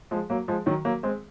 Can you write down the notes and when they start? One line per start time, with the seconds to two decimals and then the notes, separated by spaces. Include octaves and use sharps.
0.11 F3 G#3
0.30 F#3 A#3
0.48 F3 G#3
0.66 D#3 F#3
0.85 F#3 A#3
1.03 G#3 C4